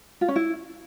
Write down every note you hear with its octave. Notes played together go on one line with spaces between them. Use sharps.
F4
C#4
E4